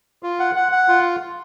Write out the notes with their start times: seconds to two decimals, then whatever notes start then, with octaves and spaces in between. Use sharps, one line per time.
0.23 F4
0.39 F#5
0.56 F#5
0.72 F#5
0.88 F4